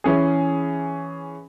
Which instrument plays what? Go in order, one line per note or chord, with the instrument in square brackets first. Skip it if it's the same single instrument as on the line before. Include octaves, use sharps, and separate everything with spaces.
[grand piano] E3 C#4 G#4